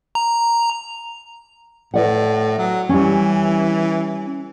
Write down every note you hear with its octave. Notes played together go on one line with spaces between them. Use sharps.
A#5
A2 B4 D5 F#5
F#3
E3 G3 C#4